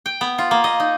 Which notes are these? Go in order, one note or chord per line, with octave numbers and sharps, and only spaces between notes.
G5
B3
F4
A#3
D#5
D#4